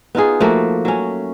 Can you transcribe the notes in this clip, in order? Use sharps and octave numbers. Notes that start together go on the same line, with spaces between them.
B3 D#4 F4 G#4
F3 A3 A#3 F#4
F#3 C#4